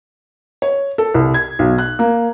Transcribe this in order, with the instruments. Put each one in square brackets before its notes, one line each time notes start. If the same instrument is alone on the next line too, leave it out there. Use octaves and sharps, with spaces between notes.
[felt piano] C#5
A4
C2
G#6
B1
F#6
A#3